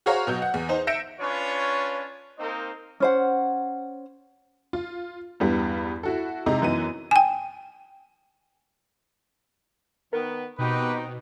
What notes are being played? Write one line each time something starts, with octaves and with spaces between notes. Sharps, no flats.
F#4 G#4 C5 C#5 F5 A#5
B2 F#3 G6
F#5
E2
D#4 C5
E5 G6 A#6 C#7 D7 E7
C#4 D4 F4 B4 C#5
A#3 C4 D#4 A#4 C5 D#5
C#4 C5 F#5
F4
E2 G2 G3 B3
E4 F#4 A4
C3 G#3 D#4 A#5
F#2 E3 B3 D#4 D#7
G5 G#5
D#3 B3 A#4
B2 D#3 C4 D#4 F#4 G4 B4